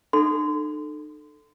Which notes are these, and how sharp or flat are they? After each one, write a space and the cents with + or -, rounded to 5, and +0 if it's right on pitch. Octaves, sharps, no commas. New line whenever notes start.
D#4 -45 A4 +0 C6 -30